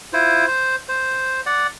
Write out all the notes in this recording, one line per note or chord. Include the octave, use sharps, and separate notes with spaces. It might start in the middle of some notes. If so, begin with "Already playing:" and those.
E4 F4 C5
C5
C5
D5 F#5